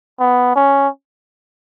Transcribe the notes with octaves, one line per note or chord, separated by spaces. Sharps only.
B3
C#4